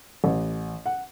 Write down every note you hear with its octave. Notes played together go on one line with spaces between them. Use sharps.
A1
F#5